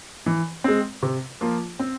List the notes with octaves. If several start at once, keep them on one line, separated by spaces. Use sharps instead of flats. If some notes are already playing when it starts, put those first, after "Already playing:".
E3
G#3 C4
C3
F3 A#3 F4
C4